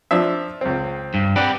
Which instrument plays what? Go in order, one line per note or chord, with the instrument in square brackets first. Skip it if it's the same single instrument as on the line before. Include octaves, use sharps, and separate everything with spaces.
[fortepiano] F3 D4 E5
C#2 C4
[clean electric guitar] G2
[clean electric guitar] C4 G4 B4 [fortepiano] D5 F#5